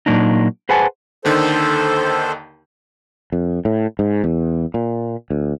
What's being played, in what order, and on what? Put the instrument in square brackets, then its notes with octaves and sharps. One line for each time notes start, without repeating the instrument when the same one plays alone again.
[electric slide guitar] A#2 F#3 A#3 D4 D#4
G#4 B4 C5 F#5 G#5 A5
[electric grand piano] D#2 D3 D#3 [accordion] A4 C5
[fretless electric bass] F2
A2
G#2
E2
A#2
D2